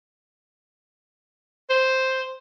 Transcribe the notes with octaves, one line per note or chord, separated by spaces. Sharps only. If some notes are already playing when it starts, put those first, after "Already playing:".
C5